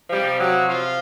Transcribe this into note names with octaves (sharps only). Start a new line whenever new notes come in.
C3 F3 G3 G4
F#3 F#4
F3 F4